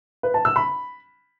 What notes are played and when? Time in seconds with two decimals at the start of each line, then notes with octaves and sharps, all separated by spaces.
0.23 B4
0.34 A5
0.45 E6
0.56 B5